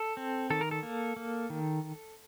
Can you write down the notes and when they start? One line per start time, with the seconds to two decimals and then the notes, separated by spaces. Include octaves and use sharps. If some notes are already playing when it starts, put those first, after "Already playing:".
Already playing: A4
0.17 C4
0.50 D#3 A4
0.61 A#4
0.71 A4
0.83 A#3
1.16 A#3
1.50 D#3